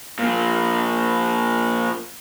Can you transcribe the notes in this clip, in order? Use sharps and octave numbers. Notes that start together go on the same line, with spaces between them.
A#2 F3